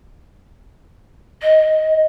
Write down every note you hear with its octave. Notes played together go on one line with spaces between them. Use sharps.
D#5